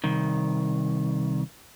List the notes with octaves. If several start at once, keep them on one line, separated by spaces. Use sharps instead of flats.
C2 D#3